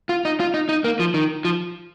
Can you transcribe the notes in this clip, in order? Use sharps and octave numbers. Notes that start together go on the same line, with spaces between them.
F4
D#4
F4
D#4
D#4
A#3
F3
D#3
F3